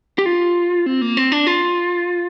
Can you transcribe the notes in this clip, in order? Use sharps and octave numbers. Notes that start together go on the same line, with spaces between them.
G4
F4
C4
A#3
C4
D4
F4